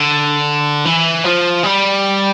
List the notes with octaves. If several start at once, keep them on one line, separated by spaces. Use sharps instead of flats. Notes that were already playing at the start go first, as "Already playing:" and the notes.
Already playing: D3
E3
F3
G3